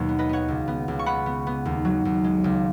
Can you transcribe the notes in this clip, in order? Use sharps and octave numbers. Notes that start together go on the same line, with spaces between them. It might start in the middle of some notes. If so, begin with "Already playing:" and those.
Already playing: D#2 B2 F#3 C#5 F#5
B3
B4 D#5
B3 C#5 F#5
C#2
B3
C#2
C#6
B3 F#5 B5
B3
B3
D#2
F#3
D#2
G#3
C#2